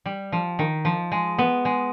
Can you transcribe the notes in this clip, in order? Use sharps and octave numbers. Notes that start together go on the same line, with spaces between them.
G3
F3
D#3
F3
G#3
B3
G#3